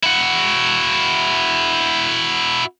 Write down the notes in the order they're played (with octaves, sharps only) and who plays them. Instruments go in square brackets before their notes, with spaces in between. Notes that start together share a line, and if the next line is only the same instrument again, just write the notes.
[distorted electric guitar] E4 F#4